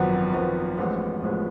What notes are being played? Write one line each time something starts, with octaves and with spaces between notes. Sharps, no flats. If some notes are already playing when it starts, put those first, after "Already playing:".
Already playing: G#1 F#2 F3 B3 F#4
G#1 F#2 F3 B3 F#4
A1 A2 F3 G#3 B3
A1 A2 F3 G#3 B3